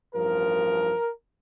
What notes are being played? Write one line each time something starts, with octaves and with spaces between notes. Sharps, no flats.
A1 G2 F3 A#4